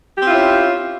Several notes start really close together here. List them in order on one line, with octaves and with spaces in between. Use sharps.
G4 C4 F4 E4 C#4